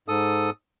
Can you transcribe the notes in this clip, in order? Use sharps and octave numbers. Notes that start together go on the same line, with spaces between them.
G#2 A4 D#6